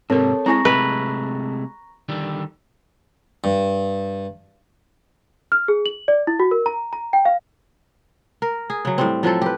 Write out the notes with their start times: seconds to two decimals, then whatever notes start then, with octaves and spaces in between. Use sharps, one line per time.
0.10 G#2 C3 C4 A4 A#4 C#5 A5
0.46 G#3 C4 E4 G#5 A#5 C#6 A#6
0.65 C3 G#3 A3 B4
2.09 D3 D#3 G3
3.44 G2
5.52 F6
5.68 G#4
5.86 F#7
6.08 D5
6.27 E4
6.40 F#4
6.51 A#4
6.66 A#5
6.93 A#5
7.13 G5
7.25 F5
8.42 A#4
8.70 G#4
8.85 C#3 F#3
8.98 A2 G3 C4
9.23 F3 F#3 C4 A4
9.42 G4 B4